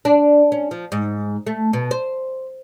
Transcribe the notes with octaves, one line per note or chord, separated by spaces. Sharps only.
D4
C#4
F3
G#2
A3
B2
C5